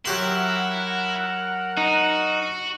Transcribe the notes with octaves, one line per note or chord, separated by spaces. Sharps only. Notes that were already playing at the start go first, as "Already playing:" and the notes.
F#3 E4 G4 A#4 F#5 C6
D#4 F#4